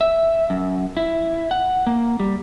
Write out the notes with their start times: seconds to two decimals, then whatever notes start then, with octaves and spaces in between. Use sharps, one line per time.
0.01 E5
0.50 F#2
0.97 E4
1.51 F#5
1.87 A#3
2.20 G3